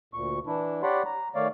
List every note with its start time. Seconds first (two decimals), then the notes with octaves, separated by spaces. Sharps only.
0.14 D2 A#2 C#6
0.47 E3 D4 E4
0.83 G4 C#5 D5 F#5 B5 C6
1.06 A#5
1.35 D#3 A3 C#5 D5 F5